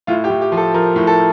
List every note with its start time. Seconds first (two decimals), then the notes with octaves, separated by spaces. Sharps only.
0.07 A2 F4
0.24 G4
0.30 A2
0.41 G4
0.52 F3
0.57 A4
0.74 F3 A#4
0.96 A2
1.07 A4